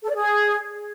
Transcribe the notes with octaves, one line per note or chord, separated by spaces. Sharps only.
A4
D5
G#4